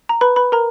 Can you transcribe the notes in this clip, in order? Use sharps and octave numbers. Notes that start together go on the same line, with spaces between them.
A#5
B4 B5
B4 B5
A#4 A#5